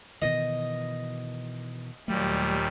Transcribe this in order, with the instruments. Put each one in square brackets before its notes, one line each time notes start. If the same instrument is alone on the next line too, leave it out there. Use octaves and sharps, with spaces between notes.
[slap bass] B2 D#3 E3 [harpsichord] D#5
[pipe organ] D#2 A#2 G3 [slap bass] F#3 A3